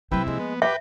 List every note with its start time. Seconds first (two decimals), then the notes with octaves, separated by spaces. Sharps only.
0.12 C3 F#3 A3 E4 B4 G5
0.26 F3 G#3 A#3
0.39 B3
0.62 G4 B4 E5 G5